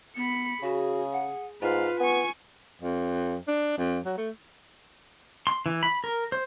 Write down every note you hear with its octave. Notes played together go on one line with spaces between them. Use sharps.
B3 B5 C#7
C#3 F#4 G#4
F#5
G#2 F4 B4 F5
B3 G#5 C#6
F2
D4
F2
F#3
A3
C6
E3
B5
A#4
C5